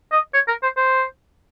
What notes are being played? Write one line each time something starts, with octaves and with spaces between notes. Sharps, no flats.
D#5
C#5
A#4
C5
C5